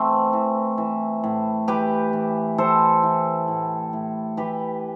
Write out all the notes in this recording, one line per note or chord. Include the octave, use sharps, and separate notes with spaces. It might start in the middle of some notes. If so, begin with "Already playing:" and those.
Already playing: E3 A3 C4
E3
E3
A2
E3 G4 B4
E3
E3 A4 C5
E3
A2
A2
E3 G4 B4